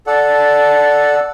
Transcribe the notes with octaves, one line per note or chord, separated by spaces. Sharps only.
A4 D5 F#5